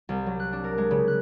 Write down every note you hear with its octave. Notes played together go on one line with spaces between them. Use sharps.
C2
F#3
F#6
D4
A#4
G#3
C#3
F#6